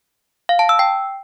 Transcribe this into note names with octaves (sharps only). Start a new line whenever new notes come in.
F5
A5
E6
G5